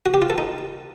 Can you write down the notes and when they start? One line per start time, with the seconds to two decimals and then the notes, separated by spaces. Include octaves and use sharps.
0.06 F#4
0.14 G4
0.22 F4
0.30 A4
0.38 D#4